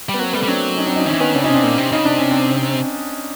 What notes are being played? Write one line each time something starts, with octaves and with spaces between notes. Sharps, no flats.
G3
B3
F#3 A#3 C4
G3 A3 B3
G3
F#3 C4 D4
C#4 D#4
C4 D4
C#4 D#4
D#3 C#4 D#4
E3
D#3 B3 C#4
C#3 C4 D4
C#4 D#4
C3
C4 D4
A#2
C3
C#3 D#4
C3 D4
C#4
C4 D4